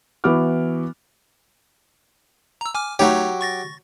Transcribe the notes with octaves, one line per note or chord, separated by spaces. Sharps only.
E3 B3 E4 F#4 D6 F6
A#5 E6
G#5 D6 F6
F#3 A3 D#4 G4 C#5
C#6 A6 A#6